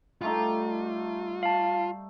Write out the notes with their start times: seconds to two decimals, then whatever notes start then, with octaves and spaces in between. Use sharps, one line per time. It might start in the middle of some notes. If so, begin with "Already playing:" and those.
0.21 G3 A3 D#4 F4
1.43 F5 A5